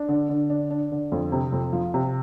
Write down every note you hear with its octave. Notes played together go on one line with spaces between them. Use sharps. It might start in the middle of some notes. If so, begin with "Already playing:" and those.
Already playing: D4
D3
D3
D4
D4
D3
F2
C3
F2
F3
C3